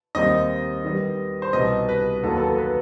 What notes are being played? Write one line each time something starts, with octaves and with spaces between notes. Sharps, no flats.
D#2 D#3 G3 C4 D#4 D#5
D#3 G3 B3
C5
C2 B2 G3 D#5
B4
D#2 D#3 F#3 B3 A4
A4
B4